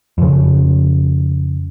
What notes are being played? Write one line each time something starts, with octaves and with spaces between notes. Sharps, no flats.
F2 C#3